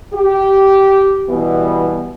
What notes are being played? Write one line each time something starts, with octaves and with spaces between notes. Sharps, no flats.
G4
B2 E3 G3 B3